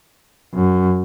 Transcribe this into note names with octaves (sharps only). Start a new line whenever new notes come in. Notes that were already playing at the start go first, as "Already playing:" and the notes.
F#2